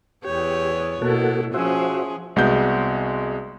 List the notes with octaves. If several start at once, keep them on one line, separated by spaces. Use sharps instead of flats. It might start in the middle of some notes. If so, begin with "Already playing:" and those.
E2 B3 G4 C#5
B2 A#3 E4 F#4 A4
F3 C#4 F#4 G#4 C5 E5
C2 G#3 B3 F#4 G6